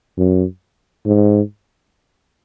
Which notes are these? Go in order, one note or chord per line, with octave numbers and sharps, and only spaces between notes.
F#2
G#2